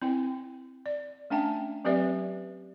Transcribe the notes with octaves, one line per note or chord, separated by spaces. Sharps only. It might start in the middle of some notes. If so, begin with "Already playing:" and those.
C4 E4 G5
D5
A3 C#4 D4 E5 G5 A5
F#3 C4 G4 B4 D5 E5